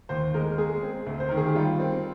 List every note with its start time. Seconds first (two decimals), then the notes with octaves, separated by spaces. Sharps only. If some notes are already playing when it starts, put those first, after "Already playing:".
0.09 D#2 C5
0.34 G#3 A#4
0.58 G#3 G#4
0.83 C4
1.06 D2
1.20 C5
1.29 D#3 A#4
1.37 G#4
1.46 G4
1.56 G3 F4
1.80 C4